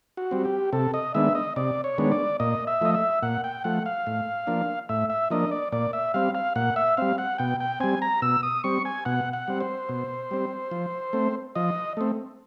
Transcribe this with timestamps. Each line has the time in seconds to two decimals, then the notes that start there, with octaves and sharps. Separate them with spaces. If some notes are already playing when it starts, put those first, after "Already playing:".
0.17 F#4
0.31 G3 C4
0.45 G4
0.73 C3 A4
0.94 D#5
1.14 D#3 G#3 B3 D4 E5
1.35 D#5
1.56 C3 D5
1.84 C#5
1.98 D#3 G#3 B3 D4
2.12 D5
2.40 A#2 D#5
2.67 E5
2.81 F3 A3 D#5
2.94 E5
3.22 A#2 F#5
3.44 G5
3.64 F3 A3 F#5
3.86 F5
4.07 A2
4.47 F3 A#3 D4
4.89 A2 E5
5.10 E5
5.30 F3 A#3 D4 D#5
5.51 D5
5.72 A#2 D5
5.93 E5
6.14 G3 C4 F5
6.35 F5
6.56 A#2 F#5
6.76 E5
6.97 G3 C4 F5
7.18 F#5
7.38 B2 G5
7.60 G5
7.80 G3 C4 G#5
8.02 A#5
8.22 B2 E6
8.43 D#6
8.64 G3 C4 C#6
8.85 G#5
9.05 B2 F#5
9.33 F#5
9.48 G3 C4
9.60 C5
9.89 B2
10.31 G3 C4
10.71 F3
11.13 A3 C4
11.55 F3 D#5
11.97 A3 C4